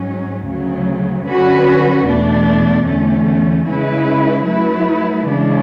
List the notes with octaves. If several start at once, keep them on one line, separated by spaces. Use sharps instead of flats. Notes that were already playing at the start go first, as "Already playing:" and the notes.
Already playing: G#2 F#3 C#4
D2 C#3 F#3
D3 F#3 C#4 F#4 B4
E2 B2 A3 D4
E2 D3 A3 C#4
C#3 G#3 C#4 E4 B4
F#3 A3 E4 B4
C#3 E3 G#3 D4